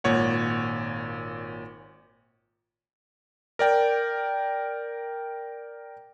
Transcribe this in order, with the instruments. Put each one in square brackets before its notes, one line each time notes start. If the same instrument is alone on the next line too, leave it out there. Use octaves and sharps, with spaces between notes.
[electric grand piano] G#1 A#2 C#5 F#5
A#4 D5 G5